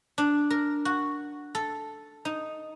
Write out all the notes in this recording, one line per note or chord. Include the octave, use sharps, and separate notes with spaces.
D4
A#4
F#4
A4
D#4